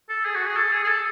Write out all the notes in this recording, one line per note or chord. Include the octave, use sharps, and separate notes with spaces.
A4
G#4
F#4
G#4
A4
G#4
G#4
A4